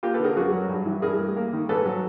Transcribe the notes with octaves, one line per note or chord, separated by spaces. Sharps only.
A#3 F4 G4
A4 B4
D3 G#4 A#4
F#2 F#4 G#4
F#3
G2
E3
G2 G#4 A#4
A3
A#3
D#3
G#2 A4 B4
F#3